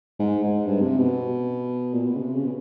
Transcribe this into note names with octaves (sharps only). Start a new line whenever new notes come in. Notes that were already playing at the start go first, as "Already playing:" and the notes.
G#2
G#2
G2
C3
B2
A#2
B2
C#3
C3
C#3
B2